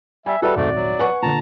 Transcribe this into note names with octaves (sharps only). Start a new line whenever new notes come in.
G3 E5 G#5
G3 F#4 A4 B4 E5
D#1 G#1 G#2 A3 D5
F#3
B4 F#5 G#5 C#6
A#2 D3 A5 A#5